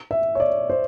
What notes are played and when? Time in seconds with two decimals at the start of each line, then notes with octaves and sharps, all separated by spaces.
0.11 E5
0.35 C#5
0.40 D5
0.70 C5